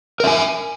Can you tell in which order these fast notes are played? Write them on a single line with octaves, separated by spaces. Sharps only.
A#4 E5 G#5